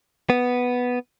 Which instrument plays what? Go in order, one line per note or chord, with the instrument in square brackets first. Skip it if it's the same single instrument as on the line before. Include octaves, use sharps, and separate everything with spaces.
[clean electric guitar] B3